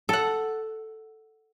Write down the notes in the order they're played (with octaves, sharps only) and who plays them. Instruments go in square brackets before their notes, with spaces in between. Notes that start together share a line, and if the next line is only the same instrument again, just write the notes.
[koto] A4 F#5